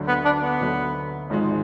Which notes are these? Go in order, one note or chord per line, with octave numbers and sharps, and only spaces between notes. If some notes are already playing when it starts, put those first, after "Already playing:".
Already playing: D2 D3 F#3
B3
D4
B3
D2 D3 F#3
G#1 G#2 F3 G#3